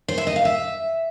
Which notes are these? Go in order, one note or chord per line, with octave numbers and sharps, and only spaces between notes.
C5
E5
D#5
F5
E5